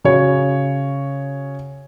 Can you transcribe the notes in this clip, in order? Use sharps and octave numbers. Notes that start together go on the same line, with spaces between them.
C#3 F#4 C#5